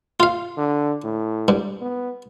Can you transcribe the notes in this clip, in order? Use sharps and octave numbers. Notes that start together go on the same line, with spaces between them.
F4 F5
D3
A2
G2
B3